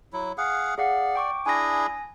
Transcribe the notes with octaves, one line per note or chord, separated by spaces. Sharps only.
F#3 E4
G#4 F5 F#5
G#4 D5 F5 F#5
G5 C#6 D6
D4 E4 G#4 G#5 A#6